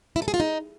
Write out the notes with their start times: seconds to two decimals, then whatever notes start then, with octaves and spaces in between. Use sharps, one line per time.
0.16 E4
0.22 A4
0.28 G#4
0.34 F4
0.40 D#4